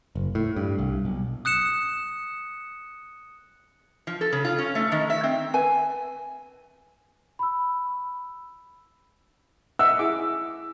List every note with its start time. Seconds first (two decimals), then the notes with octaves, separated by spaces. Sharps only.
0.15 F#1
0.35 A2
0.56 G2
0.79 C2
1.05 B1
1.45 D#6 F#6 C#7 E7
4.07 F3
4.21 A4
4.32 C#3
4.45 F4
4.58 C#4
4.75 A3
4.92 D#3
5.10 E5
5.23 C4
5.54 B4 G#5
7.39 B5 E6
9.79 D#5 E5 F#5 E6
9.99 E4 G#4 D6